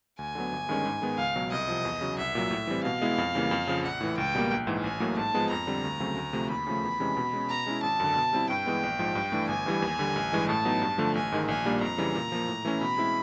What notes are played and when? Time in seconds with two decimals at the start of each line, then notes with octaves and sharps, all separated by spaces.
0.19 D2 G#5
0.35 D3 F#3 B3
0.52 G1
0.69 G2 D#3 G#3 C#4
0.86 G#2
1.02 D#3 G#3 B3
1.18 C#2 F5
1.36 B2 F#3
1.52 C2 D#5
1.68 C3 F3
1.85 E2
2.01 C#3 F#3
2.18 C2 E5
2.35 A#2 F#3
2.51 A2
2.67 E3 G3 C4
2.84 B2 F5
3.02 G#3 B3 E4
3.18 F2
3.35 C#3 E3 G3 A#3
3.51 F2
3.67 C#3 F3
3.84 A#1 F#5
4.01 A2 E3
4.17 C#2 G5
4.35 B2 G3 A#3
4.51 A#1
4.67 G#2 E3
4.83 A1 G#5
5.00 A2 F#3 A#3
5.17 G#2 A5
5.34 F3 G#3 B3
5.50 F2 A#5
5.67 D3 G3 C4
5.84 D2
6.00 C#3 F#3 A3 C4
6.16 D2
6.33 C3 F3 A3
6.50 D#2 B5
6.67 C#3 F3 A3
6.83 E2
7.00 C3 E3 G#3 C#4
7.17 B2
7.33 G#3 C#4
7.50 B2 A#5
7.66 G#3 C#4 E4
7.83 G#1 A5
8.00 F#2 D3
8.16 B2
8.33 G3 C4 E4
8.50 G2 G5
8.66 E3 G#3 B3
8.83 A#1
8.99 G#2 F3
9.15 G2
9.32 E3 A3 D4
9.48 G1 G#5
9.66 G2 E3 G3
9.82 D#2
9.99 D3 G3
10.16 A1
10.33 G2 E3 G#3
10.49 A2 A5
10.65 F#3 B3 D#4
10.82 G2
10.98 D3 F3 A3
11.15 A1 G#5
11.32 G#2 D#3 G#3
11.48 A#1 G#5
11.65 A#2 G3 A#3 D4
11.81 F2 A#5
11.98 C#3 E3 G3
12.15 A#2
12.32 F3 A#3
12.48 A2
12.65 E3 A3 C#4 E4
12.81 B2 B5
12.97 G#3 C4 E4